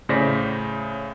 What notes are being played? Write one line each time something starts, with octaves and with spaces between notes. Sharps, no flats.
A2 C#3 C5 D5 A#6 B6